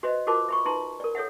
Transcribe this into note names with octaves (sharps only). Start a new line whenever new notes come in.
F#4 B4 C5 D#5 E5
F4 F#4 A#4 C5 A5 D6
E5 B5 C#6
D#4 B4 E5 A#5 C6
A#4 D5
A4 C#5 E5 F#5